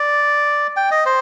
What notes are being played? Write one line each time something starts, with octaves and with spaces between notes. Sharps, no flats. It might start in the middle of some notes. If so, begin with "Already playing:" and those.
Already playing: D5
G5
D#5
C5